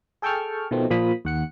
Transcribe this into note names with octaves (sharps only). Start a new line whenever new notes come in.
G#4 A4 G5 A5 C#6 F6
B2 D#3 F3 A3 C4
A#2 F3 B5 D#6
D#2 F#5 C#7